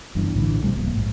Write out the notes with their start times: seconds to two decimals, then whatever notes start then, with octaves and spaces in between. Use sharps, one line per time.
0.15 F#1 E2 G2 E3
0.35 A#1 A2 D3 E3
0.62 F2 C3 G3 A3
0.77 D1 C2 F2 A#3
0.92 A#1 G#2